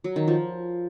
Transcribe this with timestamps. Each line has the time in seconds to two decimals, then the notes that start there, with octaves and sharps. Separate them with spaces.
0.04 F#3
0.16 D#3
0.28 F3